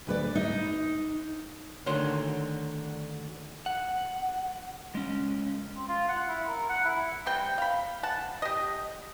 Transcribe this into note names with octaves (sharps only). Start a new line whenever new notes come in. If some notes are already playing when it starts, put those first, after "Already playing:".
D2 B4 D5
D#4 D#5
D2 D3 D#3 C#5 C6
F#5
G#3 C#4
C4
F4
F#5
E4
A#4
F#5
E4
G3 C4 G5
F5 B5
F#5 A5
G4 D#5